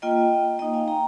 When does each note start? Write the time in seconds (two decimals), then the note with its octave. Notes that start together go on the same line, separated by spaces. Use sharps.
0.02 A#3 F4 D#5 G5
0.59 A#3 D#4 D#5 G5
0.74 F5 G#5
0.88 G5 A#5